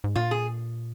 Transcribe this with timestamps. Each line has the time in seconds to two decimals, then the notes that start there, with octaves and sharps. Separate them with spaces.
0.04 G#2
0.16 A#2 F4
0.31 G#4